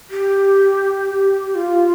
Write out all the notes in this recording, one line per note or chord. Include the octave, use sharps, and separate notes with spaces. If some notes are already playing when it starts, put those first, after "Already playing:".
G4
F4